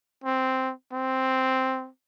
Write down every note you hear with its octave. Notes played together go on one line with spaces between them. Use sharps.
C4
C4